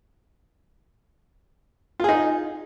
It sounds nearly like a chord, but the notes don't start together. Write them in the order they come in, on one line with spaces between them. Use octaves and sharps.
F4 G#4 D#4